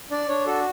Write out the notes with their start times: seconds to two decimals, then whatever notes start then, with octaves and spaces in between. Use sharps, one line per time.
0.11 D4 D5
0.28 D4 C#5
0.46 F#4 A4